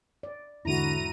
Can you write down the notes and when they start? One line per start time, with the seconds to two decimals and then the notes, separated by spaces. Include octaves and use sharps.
0.23 D5
0.65 E2 G#2 D3 G#3 E4 F#4 A#5 D#7